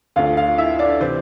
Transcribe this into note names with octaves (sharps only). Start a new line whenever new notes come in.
D2 D3 A3 F4 F5
F4 F5
E4 E5
D4 D5
C3 E3 C4 C5